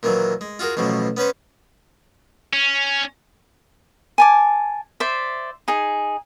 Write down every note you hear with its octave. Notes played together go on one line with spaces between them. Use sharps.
A#2 D#3 E3 F#3
G#3
F4 F#4 G#4 A#4
A1 B2 F3 F#3
B3 C#4 B4 C5
C#4
G#5 A5 D6
C5 D5 E5
D#4 G#4